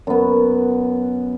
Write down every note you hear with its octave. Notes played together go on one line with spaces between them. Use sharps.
F#2 B3